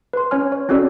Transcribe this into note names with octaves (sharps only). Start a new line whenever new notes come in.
B4 C6
C#4 C#5 G#5 F6
C#5
C4 C#4 F#4 A4 C#5 D5